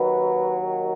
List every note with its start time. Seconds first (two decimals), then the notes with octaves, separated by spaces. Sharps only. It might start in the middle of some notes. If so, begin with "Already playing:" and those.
Already playing: D#2 D#3 F#3 B4
0.51 A#4